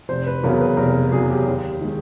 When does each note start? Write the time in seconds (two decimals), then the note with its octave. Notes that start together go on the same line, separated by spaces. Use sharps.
0.09 F1 C5
0.27 B4
0.44 E2 C#3 F#3 A#4
0.60 B4
0.77 F1 A#4
1.12 E2 C#3 F#3 G#4
1.30 G4
1.47 D#2
1.81 D#3 G#3